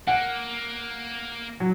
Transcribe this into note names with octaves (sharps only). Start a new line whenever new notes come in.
A#3 F#5
F#3